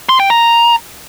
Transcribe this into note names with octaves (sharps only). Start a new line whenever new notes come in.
C6
G5
A#5